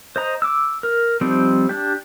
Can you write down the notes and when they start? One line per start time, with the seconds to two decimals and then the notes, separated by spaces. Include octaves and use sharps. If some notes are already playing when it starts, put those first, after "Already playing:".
0.16 C5 D#5 A#5
0.42 D6 E6
0.83 A#4
1.21 F3 G3 C4 D#4
1.69 D4 G4